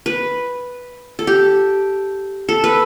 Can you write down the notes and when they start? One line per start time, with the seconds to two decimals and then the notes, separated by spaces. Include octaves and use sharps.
0.06 B4
1.19 A4
1.27 G4
2.49 A4
2.64 B4